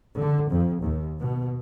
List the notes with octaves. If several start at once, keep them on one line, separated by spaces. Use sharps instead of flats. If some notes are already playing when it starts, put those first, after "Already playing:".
D3
F2
D#2
B2